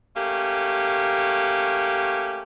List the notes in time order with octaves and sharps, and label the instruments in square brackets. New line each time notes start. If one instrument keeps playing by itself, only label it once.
[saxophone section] A3 A#3 C#4 G4